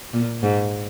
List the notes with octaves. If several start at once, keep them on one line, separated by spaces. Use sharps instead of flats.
A#2
G#2